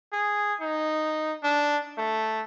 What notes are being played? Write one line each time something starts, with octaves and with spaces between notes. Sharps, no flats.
G#4
D#4
D4
A3